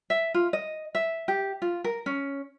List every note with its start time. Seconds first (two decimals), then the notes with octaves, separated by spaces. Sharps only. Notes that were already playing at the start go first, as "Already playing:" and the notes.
0.10 E5
0.34 F4
0.53 D#5
0.95 E5
1.28 G4
1.62 F4
1.84 A#4
2.06 C#4